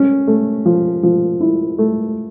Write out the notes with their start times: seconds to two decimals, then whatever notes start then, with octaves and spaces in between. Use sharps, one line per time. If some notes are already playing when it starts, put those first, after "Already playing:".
Already playing: C#4
0.27 A3
0.66 F3
1.03 F3
1.41 E4
1.78 A3